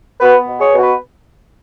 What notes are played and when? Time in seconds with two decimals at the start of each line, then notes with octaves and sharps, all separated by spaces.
0.20 B3 F#4 B4
0.47 B2
0.59 G#4 C#5
0.72 B2
0.78 F#4 B4